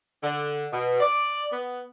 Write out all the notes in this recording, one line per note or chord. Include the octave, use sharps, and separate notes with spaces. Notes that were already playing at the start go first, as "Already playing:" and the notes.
D3
B2
D5
B3